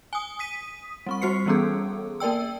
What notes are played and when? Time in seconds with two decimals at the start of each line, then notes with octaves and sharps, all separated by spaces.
0.13 G#5 D#6
0.39 D#6 B6 D#7
1.06 G3 C4 C#6
1.22 G3 F#4 C5 C7 C#7
1.46 E3 G3 B3 C#4 G#4 A4
2.20 A#3 A#4 D5 G5 E6